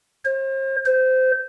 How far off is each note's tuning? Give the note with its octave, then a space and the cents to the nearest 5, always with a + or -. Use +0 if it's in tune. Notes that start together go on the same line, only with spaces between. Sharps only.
C5 +40
C5 -20